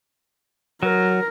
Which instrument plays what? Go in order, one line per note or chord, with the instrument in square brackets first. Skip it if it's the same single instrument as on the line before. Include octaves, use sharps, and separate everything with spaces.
[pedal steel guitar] F#3 [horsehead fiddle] A#4